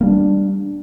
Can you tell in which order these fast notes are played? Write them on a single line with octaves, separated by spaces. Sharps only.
A#3 G3 D4